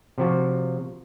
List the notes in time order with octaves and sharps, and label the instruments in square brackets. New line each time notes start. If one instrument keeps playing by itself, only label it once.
[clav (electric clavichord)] C3 F3 F#4